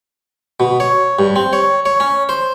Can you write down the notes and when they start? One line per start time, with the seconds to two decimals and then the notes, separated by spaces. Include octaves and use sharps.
0.60 B2
0.80 C#5
1.19 G2
1.36 C4
1.53 C#5
1.86 C#5
2.00 C#4
2.29 C5